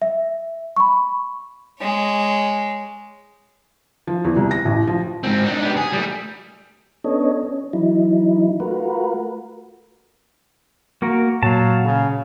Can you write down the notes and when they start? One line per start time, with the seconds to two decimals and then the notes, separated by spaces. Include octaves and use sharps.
0.02 E5
0.76 B5 C#6
1.81 G#3 C#5
4.07 F3
4.25 E2
4.36 C2
4.51 A#6
4.65 A1
4.87 F3
5.23 G#2 C4
5.45 D4 D#4
5.61 B3 G4
5.76 G#4
5.92 G3 A3
7.04 B3 C#4 D4 A4 C#5 D#5
7.43 C#4
7.73 E3 F#3 D#4 E4
8.60 A3 F4 F#4 A#4 B4
11.02 A#3 F#4 A#4
11.43 A#2 F#3 F5 A5
11.85 C#3